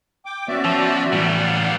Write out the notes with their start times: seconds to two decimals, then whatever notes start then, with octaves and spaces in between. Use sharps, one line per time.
0.26 G5 D6
0.48 B3 C#4 F#4 D5 E5
0.65 F3
1.12 A2 E3 G3 B3
1.39 D5 F5 F#5